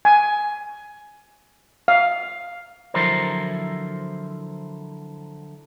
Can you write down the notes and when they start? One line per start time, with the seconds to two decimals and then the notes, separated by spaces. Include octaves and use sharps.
0.05 G#5
1.88 F5
2.94 D3 F3 F#3 E4 A#4 C5